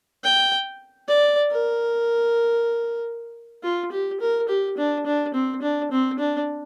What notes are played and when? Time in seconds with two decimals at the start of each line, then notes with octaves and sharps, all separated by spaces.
0.24 G5
1.08 D5
1.51 A#4
3.64 F4
3.92 G4
4.21 A#4
4.49 G4
4.78 D4
5.06 D4
5.34 C4
5.62 D4
5.91 C4
6.19 D4